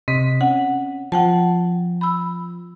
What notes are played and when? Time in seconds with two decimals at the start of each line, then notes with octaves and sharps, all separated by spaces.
0.08 C3 C4 D#5 B6
0.41 C#4 F#5
1.12 F3 F#5 G5 A5
2.01 B5 E6